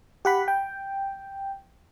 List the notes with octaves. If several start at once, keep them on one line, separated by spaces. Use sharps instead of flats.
G4 F#5 B5
G5